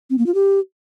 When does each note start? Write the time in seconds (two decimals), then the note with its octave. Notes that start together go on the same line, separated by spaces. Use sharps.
0.10 C4
0.18 A#3
0.26 F4
0.34 G4